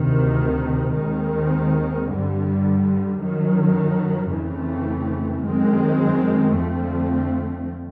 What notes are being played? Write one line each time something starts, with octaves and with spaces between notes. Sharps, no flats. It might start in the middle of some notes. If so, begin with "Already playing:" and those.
Already playing: D2 C3 D#3
D#2 D#3 G#3 C4
G2 D3 G3
F#2 D#3 F#3
F2 C#3 E3 A3 C4
F#2 D#3 G#3 C4
F2 D3 F3 A3 C4